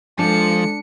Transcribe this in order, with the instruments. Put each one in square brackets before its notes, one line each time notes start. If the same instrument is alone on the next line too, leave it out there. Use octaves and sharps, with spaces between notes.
[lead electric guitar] F3 [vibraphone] G#3 A4 [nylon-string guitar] D4 [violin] C#7